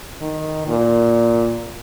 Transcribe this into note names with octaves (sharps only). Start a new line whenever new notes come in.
D#3
A#2